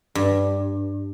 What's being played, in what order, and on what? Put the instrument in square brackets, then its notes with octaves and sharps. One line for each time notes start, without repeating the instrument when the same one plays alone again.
[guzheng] G2